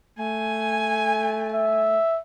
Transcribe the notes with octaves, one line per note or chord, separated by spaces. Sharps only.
A3 G#5
E5